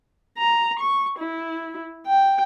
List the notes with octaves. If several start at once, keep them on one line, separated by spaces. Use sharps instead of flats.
A#5
C#6
E4
G5